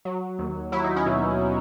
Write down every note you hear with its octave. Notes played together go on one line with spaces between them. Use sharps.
F#3
D#2
F#3 E4
D#4
C#4 E4
B2